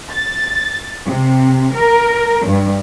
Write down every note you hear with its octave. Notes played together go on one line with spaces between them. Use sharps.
A6
C3
A#4
G2